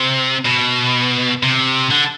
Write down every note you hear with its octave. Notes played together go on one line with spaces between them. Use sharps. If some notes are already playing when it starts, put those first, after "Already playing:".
Already playing: C3
B2
C3
D3